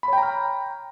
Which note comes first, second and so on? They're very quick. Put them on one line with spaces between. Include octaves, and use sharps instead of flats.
B5 C#5 G5 A#5 F6